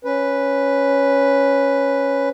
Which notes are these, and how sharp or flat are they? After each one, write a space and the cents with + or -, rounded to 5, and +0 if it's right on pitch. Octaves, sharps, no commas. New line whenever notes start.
C#4 +0 B4 +0